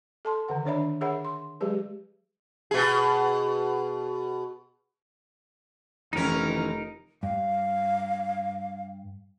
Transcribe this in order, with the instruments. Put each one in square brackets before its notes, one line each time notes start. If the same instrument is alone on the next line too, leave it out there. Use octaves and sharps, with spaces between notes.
[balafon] A4 A5 C6
D3 D#3 F#5
D#3 D4 C#5 D5 E5 B5
G#4 A#4 C#5 E5 F#5 B5
C6
F#3 G#3 G4 G#4 B4
[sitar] B2 G#4
[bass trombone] F1 [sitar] D#2 C#4 [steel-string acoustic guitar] D#3 E3 [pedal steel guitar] D#4 A#4
[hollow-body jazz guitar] G2 [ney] F5